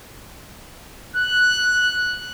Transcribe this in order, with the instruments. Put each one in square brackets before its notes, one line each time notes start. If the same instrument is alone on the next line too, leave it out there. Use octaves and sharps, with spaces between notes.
[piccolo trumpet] F#6